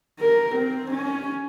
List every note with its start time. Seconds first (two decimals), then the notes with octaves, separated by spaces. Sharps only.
0.20 A#4
0.56 C4
0.91 C#4